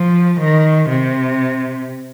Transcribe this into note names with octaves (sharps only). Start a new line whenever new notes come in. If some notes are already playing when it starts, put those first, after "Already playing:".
Already playing: F3
D#3
C3